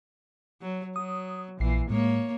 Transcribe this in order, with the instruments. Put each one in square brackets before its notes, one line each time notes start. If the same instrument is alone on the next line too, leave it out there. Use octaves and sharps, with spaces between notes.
[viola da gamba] F#3
[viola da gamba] F#3 [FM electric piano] D#6
[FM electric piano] A#1 C7 [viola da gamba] A#2 E3
[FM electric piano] A2 G#3 [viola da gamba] A#3 C#5